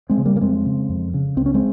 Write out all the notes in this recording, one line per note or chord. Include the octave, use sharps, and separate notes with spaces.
G#3 C4
C#3
G3 A#3
A#3
F2 G#3 C4
C#3
F2
C#3
C#2 C4
C#4
G#3 C4